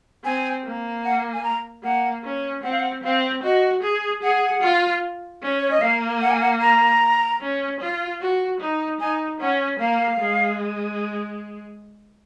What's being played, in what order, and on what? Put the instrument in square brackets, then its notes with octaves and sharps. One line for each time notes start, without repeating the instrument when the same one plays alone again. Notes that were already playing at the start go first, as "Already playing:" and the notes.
[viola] C4 [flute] G#5
[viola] A#3
[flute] F#5
G#5
A#5
[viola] A#3 [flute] F#5
[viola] C#4
[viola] C4 [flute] F#5
[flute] F5
F#5
[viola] C4 [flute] F5
[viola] F#4 [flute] D#5
[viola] G#4
[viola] G#4 [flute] F#5
[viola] F4
C#4
[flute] C#5
D#5
[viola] A#3 [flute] F5
[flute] F#5
G#5
F#5
A#5
[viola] C#4
F4
F#4
D#4
[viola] D#4 [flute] G#5
[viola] C#4 [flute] F#5
[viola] A#3 [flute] F5
[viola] G#3